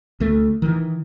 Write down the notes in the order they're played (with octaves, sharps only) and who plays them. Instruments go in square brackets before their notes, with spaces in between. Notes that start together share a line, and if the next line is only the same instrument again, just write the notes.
[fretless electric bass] D2 A3
D#3 E3